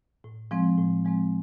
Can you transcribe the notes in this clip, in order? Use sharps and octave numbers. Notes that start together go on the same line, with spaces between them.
A2
F3 G#3 C4
A2
F3 G#3 C4